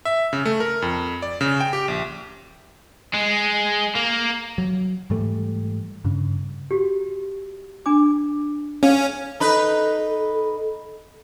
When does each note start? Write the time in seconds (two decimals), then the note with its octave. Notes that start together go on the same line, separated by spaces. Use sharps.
0.05 E5
0.33 C#3
0.45 A3
0.60 A#4
0.82 F2
1.22 D5
1.41 C#3
1.61 G5
1.73 G4
1.88 A#1
3.14 G#3
3.95 A#3
4.58 F#3
5.10 G#2 E3 G3 A3
6.04 G2 C#3
6.71 F#4 G4
7.86 D4 G#5 D6
8.83 C#4 G#4 F5
9.40 D#4 A4 B4